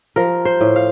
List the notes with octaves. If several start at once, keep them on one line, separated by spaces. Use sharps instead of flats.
F3 A#4
C5
A2
F5